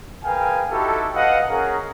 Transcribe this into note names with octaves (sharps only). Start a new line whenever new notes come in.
G#4 A#4 B4 F5 G5 G#5
D#4 E4 F#4 G4 A4
B4 D#5 F5 F#5
C#4 F#4 G#4 A#4